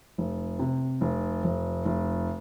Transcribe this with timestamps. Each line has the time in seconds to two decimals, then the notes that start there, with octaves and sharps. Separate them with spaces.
0.18 F1
0.59 C3
1.01 F1
1.44 F1
1.85 F1